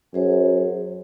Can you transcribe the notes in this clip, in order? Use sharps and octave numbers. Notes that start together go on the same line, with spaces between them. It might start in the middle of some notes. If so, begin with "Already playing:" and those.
F#2 G#4 C5